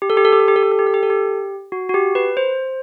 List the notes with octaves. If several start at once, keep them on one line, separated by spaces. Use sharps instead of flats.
G4
A4
G4
A4
G4
A4
G4
A4
G4
A4
G4
A4
G4
A4
G4
F#4
F#4
G4
B4
C5